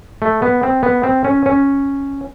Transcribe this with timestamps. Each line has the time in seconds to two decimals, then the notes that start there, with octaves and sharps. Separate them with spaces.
0.22 A3
0.42 B3
0.63 C4
0.83 B3
1.03 C4
1.25 C#4
1.46 C#4